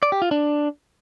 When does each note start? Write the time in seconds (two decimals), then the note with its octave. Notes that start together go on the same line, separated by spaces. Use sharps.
0.03 D5
0.12 G4
0.22 F4
0.31 D4